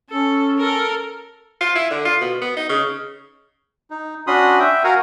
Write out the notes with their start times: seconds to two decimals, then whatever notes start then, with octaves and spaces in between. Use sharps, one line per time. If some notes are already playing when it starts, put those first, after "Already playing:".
0.10 C#4 A4
0.57 A4 A#4
1.61 F4
1.75 E4
1.91 D3
2.05 F4
2.21 B2
2.41 B3
2.57 D#4
2.69 C#3
3.90 D#4
4.27 C#4 D4 F#4 B5 C6 D#6
4.60 E5 G5
4.84 F#4 A#4 F5 F#5 G#5 A#5